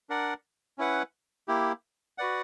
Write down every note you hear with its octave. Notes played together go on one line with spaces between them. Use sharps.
D4 A#4 D5 F#5
C#4 E4 B4 F#5
A#3 E4 G4
F#4 B4 D5 F#5